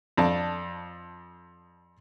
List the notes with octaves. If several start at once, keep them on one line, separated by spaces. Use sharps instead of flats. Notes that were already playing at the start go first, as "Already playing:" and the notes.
F2 D4 A5